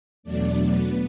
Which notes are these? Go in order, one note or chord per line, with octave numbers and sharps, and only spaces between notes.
E2 B2 F#3 A3 D4 D5
B3 B4